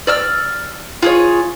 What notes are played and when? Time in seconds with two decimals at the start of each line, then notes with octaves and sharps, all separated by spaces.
0.07 D5 E6 F6
1.02 F4 G#4 C#5